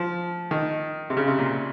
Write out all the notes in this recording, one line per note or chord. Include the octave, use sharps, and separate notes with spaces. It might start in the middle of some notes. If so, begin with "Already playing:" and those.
Already playing: F3
D#3
C3
C#3
C3
A#2